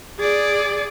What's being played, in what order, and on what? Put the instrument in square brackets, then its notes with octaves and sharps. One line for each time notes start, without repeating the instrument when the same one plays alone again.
[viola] G#4 D5